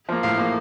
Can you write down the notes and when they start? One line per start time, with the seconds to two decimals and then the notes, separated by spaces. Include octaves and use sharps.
0.09 F3 A#3
0.23 A2 F5
0.38 F3 A#3